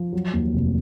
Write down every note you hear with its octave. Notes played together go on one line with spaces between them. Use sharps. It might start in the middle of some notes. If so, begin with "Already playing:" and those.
Already playing: F3
F#3
D#2
F1